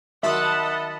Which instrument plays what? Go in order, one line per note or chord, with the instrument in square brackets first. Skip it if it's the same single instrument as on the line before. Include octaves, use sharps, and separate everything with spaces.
[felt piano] D#3 F#3 C6 [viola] D#5 F#5 [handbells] E5 [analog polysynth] A5 B5